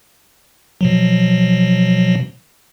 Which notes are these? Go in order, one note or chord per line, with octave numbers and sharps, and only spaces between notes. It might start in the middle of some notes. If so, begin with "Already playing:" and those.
B2 F3 F#3